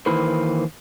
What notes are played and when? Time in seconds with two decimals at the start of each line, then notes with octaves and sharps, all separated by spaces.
0.06 D#3 E3 A#3 B4 C5